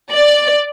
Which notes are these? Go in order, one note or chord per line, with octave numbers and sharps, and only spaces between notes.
D5